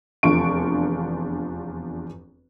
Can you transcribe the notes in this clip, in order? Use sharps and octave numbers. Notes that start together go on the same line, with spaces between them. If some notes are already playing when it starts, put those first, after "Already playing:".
F1 E2 D4 F4 C#6 D7